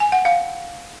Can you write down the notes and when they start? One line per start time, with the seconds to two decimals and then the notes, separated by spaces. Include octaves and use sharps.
0.00 G#5
0.12 F#5
0.25 F5